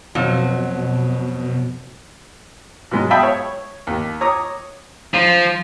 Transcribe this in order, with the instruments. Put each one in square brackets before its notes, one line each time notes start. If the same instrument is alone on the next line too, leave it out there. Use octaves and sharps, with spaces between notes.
[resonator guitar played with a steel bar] F2 F#3 [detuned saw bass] B2
[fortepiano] B2 F#3 G#3
E5 F5 G5 A5 B5 D#6
C#5
D#2
C#5 A#5 D6 D#6
[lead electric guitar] F3